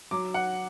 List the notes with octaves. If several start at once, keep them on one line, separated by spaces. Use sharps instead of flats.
F#3 D6
F#5